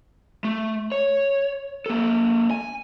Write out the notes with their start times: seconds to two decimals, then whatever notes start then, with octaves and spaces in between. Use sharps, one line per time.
0.44 A3
0.92 C#5
1.86 A#3 A4
2.51 G#5